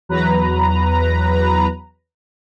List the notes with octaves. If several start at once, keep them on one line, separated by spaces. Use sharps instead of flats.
E2 F#3 B4 A#5